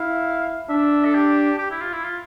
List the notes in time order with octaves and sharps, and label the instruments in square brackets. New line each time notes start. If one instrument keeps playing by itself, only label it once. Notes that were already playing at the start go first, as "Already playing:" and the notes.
Already playing: [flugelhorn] E4 [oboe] F5
[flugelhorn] D4 [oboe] E5
[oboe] A4
G4
G4
E4
F4
E4
F4